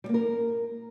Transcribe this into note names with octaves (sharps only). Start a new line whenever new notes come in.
G3
A#3
A#4